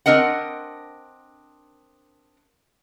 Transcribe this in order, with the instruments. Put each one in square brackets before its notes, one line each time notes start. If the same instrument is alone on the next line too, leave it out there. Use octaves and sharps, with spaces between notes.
[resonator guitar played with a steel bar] C4 D4 A#4 D#5 F#5